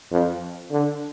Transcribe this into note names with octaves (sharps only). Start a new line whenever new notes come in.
F2
D3